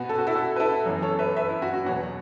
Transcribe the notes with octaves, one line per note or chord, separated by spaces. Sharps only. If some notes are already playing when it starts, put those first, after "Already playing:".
Already playing: B2 B3 F#4 B4
A4
F#4
E4 A4
F#4
B4
E4 A4
F#2 E3 B3
A4 C#5
B4 E5
B4 E5
E4
F#4
F#4
E2 B2 F#3 B3 C#5 F#5